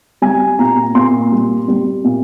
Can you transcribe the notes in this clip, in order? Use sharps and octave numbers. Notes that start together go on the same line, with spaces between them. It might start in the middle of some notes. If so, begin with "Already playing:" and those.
G3 G#5
A#2 A#5
A#2 C6
G3
G3
A#2